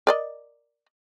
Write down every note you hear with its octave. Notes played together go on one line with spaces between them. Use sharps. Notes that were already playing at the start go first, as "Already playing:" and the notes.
A#4 D5 D#5